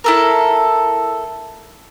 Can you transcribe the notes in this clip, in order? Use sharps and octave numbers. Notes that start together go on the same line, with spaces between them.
E4 A4 A#4